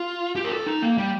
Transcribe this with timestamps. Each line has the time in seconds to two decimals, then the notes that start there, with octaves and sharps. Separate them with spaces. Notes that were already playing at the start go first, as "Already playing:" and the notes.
Already playing: F4
0.36 G4
0.44 A#4
0.52 A4
0.66 D#4
0.82 A#3
0.98 G3